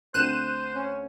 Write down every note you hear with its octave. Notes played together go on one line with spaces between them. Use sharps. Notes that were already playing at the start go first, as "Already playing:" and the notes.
D2 C4 C5 F#6 G6 D#7 E7
C#4